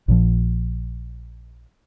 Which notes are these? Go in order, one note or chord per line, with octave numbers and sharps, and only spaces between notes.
A#1 A#2 F3